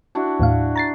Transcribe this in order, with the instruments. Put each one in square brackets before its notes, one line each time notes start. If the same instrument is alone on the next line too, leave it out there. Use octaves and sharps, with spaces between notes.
[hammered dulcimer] D4 E4 F#4
[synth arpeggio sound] D#2 A2 F5
A#5 A6 C7